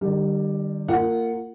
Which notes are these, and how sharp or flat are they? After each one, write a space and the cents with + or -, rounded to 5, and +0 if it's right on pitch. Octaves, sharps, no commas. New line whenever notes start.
D#3 -45 G3 +0
A#3 -25 F4 -20 F#5 +0